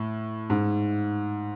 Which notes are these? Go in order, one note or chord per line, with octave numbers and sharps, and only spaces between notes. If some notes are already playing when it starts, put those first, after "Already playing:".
Already playing: A2
G#2